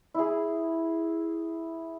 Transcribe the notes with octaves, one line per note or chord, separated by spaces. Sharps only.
E4 G#4